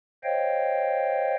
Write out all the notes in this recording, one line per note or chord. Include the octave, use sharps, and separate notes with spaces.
C5 C#5 D#5 F5 G5